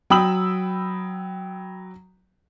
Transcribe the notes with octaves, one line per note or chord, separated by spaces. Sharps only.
F#3 G5 B5 D#6 E6 F#7